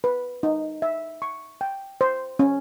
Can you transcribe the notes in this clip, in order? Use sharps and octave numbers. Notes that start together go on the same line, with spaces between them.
B4
D#4
E5
C#6
G5
C5
C#4